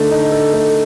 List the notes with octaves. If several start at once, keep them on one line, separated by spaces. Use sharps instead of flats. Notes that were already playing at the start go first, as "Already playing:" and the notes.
Already playing: D3 A3 D#4 A4
D#4
A4
A3